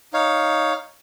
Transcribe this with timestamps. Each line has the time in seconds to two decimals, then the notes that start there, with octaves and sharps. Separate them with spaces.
0.13 D#4 C#5 F5